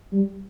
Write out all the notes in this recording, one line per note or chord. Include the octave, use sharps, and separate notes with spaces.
G3